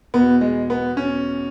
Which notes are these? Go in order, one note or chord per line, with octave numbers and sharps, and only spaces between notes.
E2 B2 B3
G#3
B3
C#4